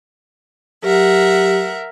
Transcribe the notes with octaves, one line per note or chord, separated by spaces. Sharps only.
F#3 G4 A#4 E5 F#5